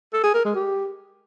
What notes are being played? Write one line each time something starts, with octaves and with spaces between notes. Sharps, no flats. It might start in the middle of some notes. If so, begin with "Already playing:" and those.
A4
G#4
A#4
G#3
G4